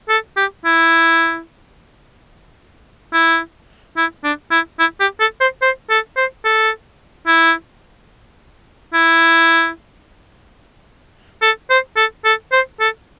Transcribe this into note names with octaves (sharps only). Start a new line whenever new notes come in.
A4
G4
E4
E4
E4
D4
E4
E4
G4
A4
C5
C5
A4
C5
A4
E4
E4
A4
C5
A4
A4
C5
A4